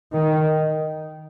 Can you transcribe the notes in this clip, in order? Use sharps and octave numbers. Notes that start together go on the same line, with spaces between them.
D#3